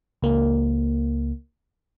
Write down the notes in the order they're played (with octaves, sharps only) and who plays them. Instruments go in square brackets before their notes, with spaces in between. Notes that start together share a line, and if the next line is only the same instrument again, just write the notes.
[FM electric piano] C#2 A#3